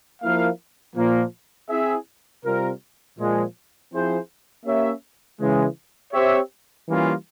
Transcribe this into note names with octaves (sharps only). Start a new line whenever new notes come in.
F3 A#3 E4 A#4 F5
A#2 F3 A#3
C4 E4 G#4 E5
C3 G3 C4 F4 A#4
A#2 F3 G#3
F3 C4 E4 G#4 C5
A#3 C#4 G4 C#5 E5
C#3 E3 G#3
C4 G4 C#5 E5
E3 G3 A#3 C#4 F4